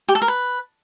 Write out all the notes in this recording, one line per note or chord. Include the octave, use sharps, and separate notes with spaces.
G4
A4
A#4
B4